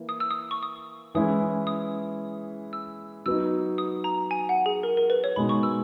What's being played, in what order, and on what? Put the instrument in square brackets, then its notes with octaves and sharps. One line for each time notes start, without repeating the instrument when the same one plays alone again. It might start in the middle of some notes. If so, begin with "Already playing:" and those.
Already playing: [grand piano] E3 A#3
[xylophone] D#6
E6
D#6
C#6
D#6
[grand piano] E3 G#3 C#4 E4 G#4 [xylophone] D#6
[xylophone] D#6
E6
[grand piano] F#3 B3 D#4 [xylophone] E6
[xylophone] D#6
A#5
G#5
F#5
G#4
A#4
A#4
B4
C#5
[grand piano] B2 G#3 D#4 [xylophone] B5
[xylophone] C#6
E6